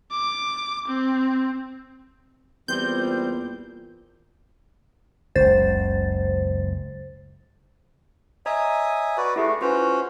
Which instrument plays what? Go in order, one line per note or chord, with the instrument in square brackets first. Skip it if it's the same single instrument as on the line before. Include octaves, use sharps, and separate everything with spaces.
[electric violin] D6
C4
[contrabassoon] E2 [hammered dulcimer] A#2 [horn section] G3 C4 [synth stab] G6
[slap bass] F#1 C#2 [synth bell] C5 A6
[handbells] C#5 D#5 A#5 [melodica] E5 G#5 D#6
[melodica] F#4 B4 D5
[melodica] A3 [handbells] E4 G4 G#4
[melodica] C#4 F#4 C5 [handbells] F4 B4